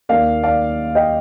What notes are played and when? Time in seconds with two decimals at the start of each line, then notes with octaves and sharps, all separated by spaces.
0.09 D#2 D#3 A#3 D#4 D5 F5
0.43 D5 F5
0.95 D#5 G5